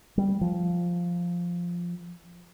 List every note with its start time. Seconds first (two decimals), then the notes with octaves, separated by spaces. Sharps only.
0.18 G3
0.41 F3